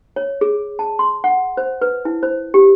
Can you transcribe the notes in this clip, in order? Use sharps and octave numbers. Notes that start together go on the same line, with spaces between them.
C#5
G#4
A5
C6
F#5
C5
B4
E4
C5
G4